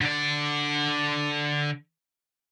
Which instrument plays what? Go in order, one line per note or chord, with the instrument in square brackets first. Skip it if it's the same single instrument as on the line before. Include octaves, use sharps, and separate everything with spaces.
[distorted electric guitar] D3 D5